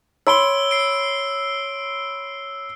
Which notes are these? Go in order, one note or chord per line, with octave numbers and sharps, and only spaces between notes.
C#5 B5 C6 E6 D7 G7
C7 D7